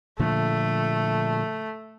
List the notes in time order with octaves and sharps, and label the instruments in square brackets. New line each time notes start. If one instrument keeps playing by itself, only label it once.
[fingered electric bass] A#2 D3 F3 [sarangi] A3